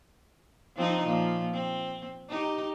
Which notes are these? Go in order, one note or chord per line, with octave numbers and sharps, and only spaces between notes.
F3 C4 D#4
A#2 F3
C4
D#4 G4